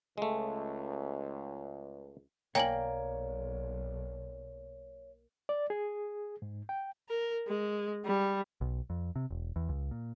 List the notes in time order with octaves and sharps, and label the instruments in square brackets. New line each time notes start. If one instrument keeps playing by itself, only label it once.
[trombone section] C#2 [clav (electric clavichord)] G#3 A3
[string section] B1 [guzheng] A#3 [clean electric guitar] C#5 D5 [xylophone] G5 G#5 F#7
[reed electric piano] D5
G#4
G#2
G5
[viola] A#4
G#3
G3
[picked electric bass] B1
F2
C3
E1
E2
C#2
A#2